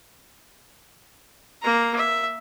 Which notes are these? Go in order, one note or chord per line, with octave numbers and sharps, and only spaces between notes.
A#3 A#5
E5